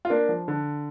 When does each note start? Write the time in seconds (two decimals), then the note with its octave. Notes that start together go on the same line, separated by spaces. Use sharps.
0.05 F4
0.10 A#3 D4
0.29 F3
0.48 D3